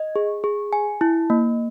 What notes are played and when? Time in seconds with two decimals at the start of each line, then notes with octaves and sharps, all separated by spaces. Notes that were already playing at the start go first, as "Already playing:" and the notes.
Already playing: D#5
0.16 G#4
0.44 G#4
0.73 G#5
1.01 E4
1.30 A#3